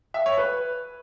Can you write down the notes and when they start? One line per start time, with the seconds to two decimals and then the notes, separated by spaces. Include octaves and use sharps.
0.14 E5
0.26 C#5
0.37 B4